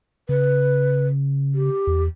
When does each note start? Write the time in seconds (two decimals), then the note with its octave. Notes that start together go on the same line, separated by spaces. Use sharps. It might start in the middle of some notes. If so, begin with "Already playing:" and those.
0.29 C#3 B4
1.55 G4
1.87 E2